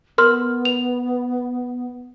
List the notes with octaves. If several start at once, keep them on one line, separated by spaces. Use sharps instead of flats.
B3 A#4 C6 F6
F7